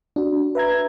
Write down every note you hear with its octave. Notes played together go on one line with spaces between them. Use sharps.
D4 F#4
B4 E5 A#5 G#6